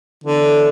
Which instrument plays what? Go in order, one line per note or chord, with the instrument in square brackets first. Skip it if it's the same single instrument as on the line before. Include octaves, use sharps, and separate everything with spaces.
[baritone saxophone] D3 [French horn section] E3 B3 E4 A4 C#5